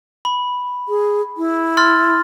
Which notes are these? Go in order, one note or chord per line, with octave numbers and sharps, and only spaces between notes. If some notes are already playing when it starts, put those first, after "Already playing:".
B5
G#4
E4
C6 F6 A6